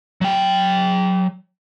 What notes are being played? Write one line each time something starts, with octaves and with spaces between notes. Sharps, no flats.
F#3 G5